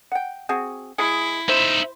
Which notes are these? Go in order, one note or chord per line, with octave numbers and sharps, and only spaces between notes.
F#5 G5
C4 F#4 G#4
G#3 E4 G#4
D#4 C5 E5